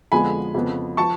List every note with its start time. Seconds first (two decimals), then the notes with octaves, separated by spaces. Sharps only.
0.12 F2 D3 F3 G#3 B3 G#5 B5
0.54 F2 C#3 F3 B3
0.97 F3 A5 C#6